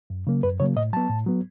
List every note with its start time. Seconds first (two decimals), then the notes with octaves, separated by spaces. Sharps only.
0.10 F#2
0.27 C#3 F#3 A#3
0.43 F#2 B4
0.60 C#3 F#3 A#3 C#5
0.76 A2 D#5
0.93 F#3 B3 A5
1.10 A2
1.27 F#3 B3